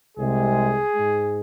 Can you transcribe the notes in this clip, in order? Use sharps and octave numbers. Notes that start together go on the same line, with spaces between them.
C2 C3 G#3 G#4
G#2 G#3